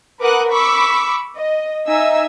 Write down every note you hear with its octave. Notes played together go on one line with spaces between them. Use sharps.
A#4 B4 F#5 D6 D#6 F#6
B5 C#6 D6 E6 B6
D#5
D#4 E5 G#5 E6